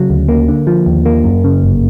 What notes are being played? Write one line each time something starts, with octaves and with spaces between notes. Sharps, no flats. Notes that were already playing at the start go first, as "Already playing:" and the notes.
Already playing: C#3 F#3
D2
A#3
D3
F3
D#2
A#3
F#2
C#3
G1